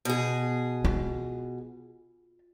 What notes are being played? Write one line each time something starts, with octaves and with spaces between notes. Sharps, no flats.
B2 G#4
F4